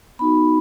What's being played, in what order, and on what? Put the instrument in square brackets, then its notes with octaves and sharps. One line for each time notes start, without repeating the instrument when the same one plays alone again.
[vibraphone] B3 D#4 F#4 B5